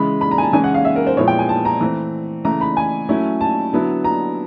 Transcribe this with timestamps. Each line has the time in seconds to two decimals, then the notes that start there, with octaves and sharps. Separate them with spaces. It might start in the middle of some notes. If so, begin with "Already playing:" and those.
Already playing: C#3 E3 G#3 B5
0.21 B5
0.31 A#5
0.38 G#5
0.43 A5
0.53 C#3 E3 G#3 C#4 E4 G#5
0.64 F#5
0.74 F5
0.85 E5
0.96 A#4
1.07 C5
1.17 A#2 F3 G#3 B3 E4 C#5
1.28 G5
1.39 G#5
1.49 A5
1.65 A#5
1.81 E3 A3 C4
2.45 C#3 E3 A3 A#5
2.61 B5
2.77 G#5
3.09 F#3 A3 C#4 E4
3.41 A5
3.73 D3 F#3 B3 E4
4.04 A#5